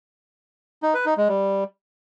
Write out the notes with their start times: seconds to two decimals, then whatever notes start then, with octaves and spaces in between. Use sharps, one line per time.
0.83 D#4
0.94 B4
1.06 D#4
1.17 G#3
1.29 G3